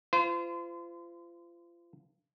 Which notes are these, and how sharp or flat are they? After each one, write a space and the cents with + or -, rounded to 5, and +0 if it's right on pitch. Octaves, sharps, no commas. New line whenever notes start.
F4 -30 C5 -35